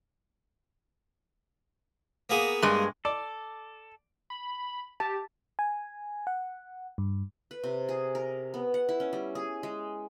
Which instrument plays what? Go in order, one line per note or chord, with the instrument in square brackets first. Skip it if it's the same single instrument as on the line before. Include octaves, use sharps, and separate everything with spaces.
[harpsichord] A#3 B3 G#4
[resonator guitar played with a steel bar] G2 G#3
[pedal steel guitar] A4 [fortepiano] D5
[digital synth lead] B5
[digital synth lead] G4 [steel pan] A5
[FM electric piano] G#5
F#5
G2
[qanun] B4
C3
G#4
A#4
B3
F#5
E4
C#4
G3
G#4
G#3